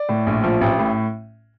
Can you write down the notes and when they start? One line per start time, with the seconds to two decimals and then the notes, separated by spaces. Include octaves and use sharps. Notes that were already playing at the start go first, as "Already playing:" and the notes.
Already playing: D5
0.09 A2
0.27 A#1
0.44 F3
0.61 A1
0.79 A2